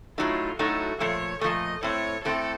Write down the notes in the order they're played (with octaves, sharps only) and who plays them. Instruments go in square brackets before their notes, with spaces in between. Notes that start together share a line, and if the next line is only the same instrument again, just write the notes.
[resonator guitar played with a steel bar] A2 F#3 A3 D#4 [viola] F4
[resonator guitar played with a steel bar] A2 F#3 A3 D#4 [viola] F#4
[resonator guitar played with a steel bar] A#2 F3 A3 [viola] C#5
[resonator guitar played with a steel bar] A#2 F3 A3 [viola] D#5
[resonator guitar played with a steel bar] A2 A3 C4 [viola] C#5
[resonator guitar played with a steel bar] A2 A3 C4 [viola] A4